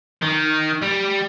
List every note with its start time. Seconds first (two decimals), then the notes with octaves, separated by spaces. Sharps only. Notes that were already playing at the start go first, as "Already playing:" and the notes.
0.22 D#3
0.82 G3